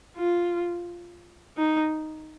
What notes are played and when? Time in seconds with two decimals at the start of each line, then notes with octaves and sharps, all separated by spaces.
0.17 F4
1.58 D#4